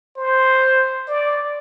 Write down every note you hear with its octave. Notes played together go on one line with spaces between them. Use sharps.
C5
D5